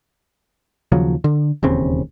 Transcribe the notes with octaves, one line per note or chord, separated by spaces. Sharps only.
D#2 C#3 F3 F#3
D3
E1 D#2 C#3 C4